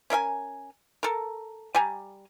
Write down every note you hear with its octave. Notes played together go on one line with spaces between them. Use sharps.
C#4 A#4 E5 G#5
A4 A#4
G3 G#5 A#5